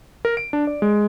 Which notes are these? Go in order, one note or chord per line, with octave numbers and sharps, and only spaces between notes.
A#4
D7
D4
D5
G#3